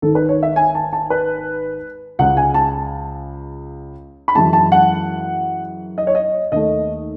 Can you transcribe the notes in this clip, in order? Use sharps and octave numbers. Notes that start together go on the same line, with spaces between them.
G#1 G#2 D#3 A4
B4
C#5
E5
G#5
A5
A5
B4
C#2 C#3 G#3 F#5
G#5
A5
B5
F#2 E3 G#3 A5
A5
F#5
D#5
C#5
D#5
D#2 D#3 A3 D#5